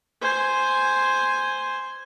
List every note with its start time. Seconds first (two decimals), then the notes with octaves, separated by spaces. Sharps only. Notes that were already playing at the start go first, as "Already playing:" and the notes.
0.21 C5 G#5